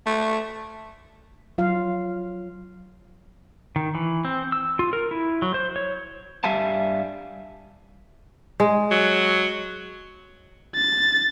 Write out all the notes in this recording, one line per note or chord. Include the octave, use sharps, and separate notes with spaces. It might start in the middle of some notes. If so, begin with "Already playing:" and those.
A3
F#3 F4 F5
D#3
E3
C4
E6
F4
A#4
E4
F#3
C5
C#5
G2 G3 E5 F5 G#5 A5
G#3
F#3
A6